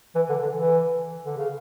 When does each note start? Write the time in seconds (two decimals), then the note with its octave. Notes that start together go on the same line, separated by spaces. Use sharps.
0.15 E3
0.29 D3
0.43 D3
0.57 E3
1.26 D3
1.37 C#3